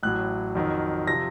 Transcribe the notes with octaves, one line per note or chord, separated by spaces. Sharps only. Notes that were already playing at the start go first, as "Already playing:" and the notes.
A1 A2 F#3 F#6
F2 D#3 F#3
C3 F3 A#6